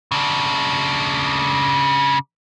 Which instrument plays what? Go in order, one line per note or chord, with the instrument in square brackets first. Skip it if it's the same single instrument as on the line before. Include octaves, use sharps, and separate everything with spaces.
[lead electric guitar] C#3 D4